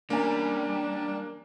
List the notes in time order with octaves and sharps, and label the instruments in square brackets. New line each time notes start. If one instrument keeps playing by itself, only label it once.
[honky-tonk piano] E2 C#4 G#5 [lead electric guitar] G3 [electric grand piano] A#3 [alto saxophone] D4